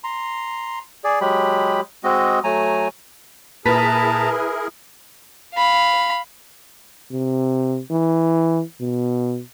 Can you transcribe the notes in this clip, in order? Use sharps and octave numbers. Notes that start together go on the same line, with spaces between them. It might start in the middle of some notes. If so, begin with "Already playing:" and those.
A#5 C6
G#4 D5
F#3 G#3 G4 B5
G#3 C4 F#4 D#5
F#3 A3 G#5 A#5
A#2 E4 G#4 A#4 B4 A5 A#5 B6
F5 B5
C3
E3
B2